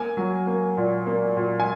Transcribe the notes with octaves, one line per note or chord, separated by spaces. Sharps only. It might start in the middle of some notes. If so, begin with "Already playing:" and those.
Already playing: A#3 G#5
F#3
A#3
A#2
A#3
A#2
G#5